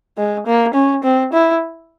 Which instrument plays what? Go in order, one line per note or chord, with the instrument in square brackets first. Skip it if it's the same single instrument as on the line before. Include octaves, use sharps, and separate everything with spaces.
[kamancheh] G#3
A#3
C#4
C4
E4